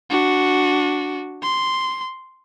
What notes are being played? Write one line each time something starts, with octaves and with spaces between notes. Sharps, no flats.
D4 F#4
C6